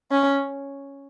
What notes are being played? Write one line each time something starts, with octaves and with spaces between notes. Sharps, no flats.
C#4